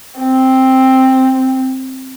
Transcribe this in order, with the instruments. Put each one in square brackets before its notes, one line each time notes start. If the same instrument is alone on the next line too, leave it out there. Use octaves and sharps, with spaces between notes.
[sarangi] C4